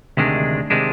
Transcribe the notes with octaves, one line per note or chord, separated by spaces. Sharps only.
D2 C3 D#3 G#3 D4
C3 D#3 G#3 D4